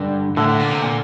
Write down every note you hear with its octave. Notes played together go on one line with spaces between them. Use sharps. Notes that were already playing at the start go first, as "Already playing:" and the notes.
Already playing: G2 D3
A2 D3
A2
A#2
C3
A#2